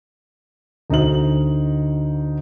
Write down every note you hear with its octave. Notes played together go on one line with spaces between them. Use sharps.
D2 D#4 F#4 C5 D#5 F#7